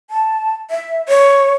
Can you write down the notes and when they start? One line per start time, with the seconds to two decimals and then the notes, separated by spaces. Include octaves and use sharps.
0.10 A5
0.71 E5
1.09 C#5